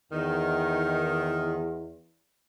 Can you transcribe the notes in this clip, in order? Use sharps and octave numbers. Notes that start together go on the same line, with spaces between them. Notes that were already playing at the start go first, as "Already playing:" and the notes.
E2 D#3